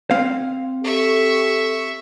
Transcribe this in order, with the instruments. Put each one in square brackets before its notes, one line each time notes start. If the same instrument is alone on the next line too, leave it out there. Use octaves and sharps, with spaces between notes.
[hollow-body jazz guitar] C4 F5
[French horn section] G4 A4 [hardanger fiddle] E5 C#6